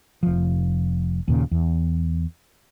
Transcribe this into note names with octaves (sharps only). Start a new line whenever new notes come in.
F1 F3
D#2 A#2 C#3
E2